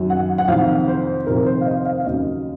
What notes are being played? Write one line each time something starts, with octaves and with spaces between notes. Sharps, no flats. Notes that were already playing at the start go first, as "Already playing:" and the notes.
Already playing: F#2 D#3 F#3
F#5
F#5
F2 C3 D#3 F5
C5
F2 C3 D#3 A#4
C5
F5
D#5
F5
F5
D#2 C#3 F#3 D#5